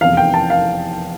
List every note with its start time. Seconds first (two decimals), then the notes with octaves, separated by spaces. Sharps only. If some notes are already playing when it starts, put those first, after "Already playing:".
0.01 F1 E2 E3 F5
0.17 G5
0.34 A5
0.50 F5